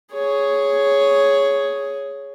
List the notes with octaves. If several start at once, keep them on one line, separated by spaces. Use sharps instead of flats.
G#4 C#5